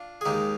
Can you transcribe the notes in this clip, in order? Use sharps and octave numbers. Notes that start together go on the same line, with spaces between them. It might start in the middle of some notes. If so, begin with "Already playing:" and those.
Already playing: D4 F4
G#4
D#2 D#3 G#3 D#4 G4